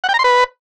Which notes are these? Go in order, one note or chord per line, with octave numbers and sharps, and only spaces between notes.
F#5
G5
A#5
C6
B4